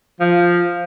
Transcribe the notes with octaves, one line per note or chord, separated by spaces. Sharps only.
F3